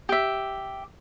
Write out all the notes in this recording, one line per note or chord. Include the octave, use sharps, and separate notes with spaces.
G4 E5